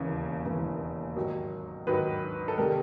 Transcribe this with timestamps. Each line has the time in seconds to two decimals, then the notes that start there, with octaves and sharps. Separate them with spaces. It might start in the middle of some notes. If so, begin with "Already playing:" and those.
Already playing: E1 D#2 C#3 E3
0.45 E1 D#2 C#3 E3
1.16 G#2 D#3 F#3
1.87 G#2 D#3 F#3 B4
2.48 A4
2.58 C3 D#3 G3 A#4